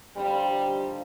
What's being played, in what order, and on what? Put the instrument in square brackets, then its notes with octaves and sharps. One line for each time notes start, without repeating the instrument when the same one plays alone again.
[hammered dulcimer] D3 F3 C4 D#4 [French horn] G3
[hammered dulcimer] D3 F3